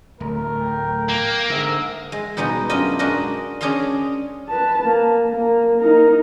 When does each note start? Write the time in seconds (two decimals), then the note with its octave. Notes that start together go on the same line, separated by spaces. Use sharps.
0.20 D1 A3 A#4
0.61 G5
1.09 A#3
1.50 G#2 D3 E5
2.12 G#3
2.37 B2 G3 G#3 D#4 F#4
2.70 F#2 D4 F4 D#5
2.99 G#3 D4 F#4 A#4 D#5
3.61 C#4 D4 G#4 D#5 F5 C6
4.49 B4 A5
4.83 A#3
5.29 A#3
5.80 D#4 A#4